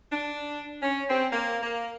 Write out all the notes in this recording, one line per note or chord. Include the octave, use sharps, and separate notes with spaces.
D4
C#4
C4
A#3
A#3